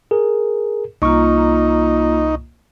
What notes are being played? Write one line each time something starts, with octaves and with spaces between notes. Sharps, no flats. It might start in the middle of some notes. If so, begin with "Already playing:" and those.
G#4 A#4
C2 A#3 D#4 F4 C#6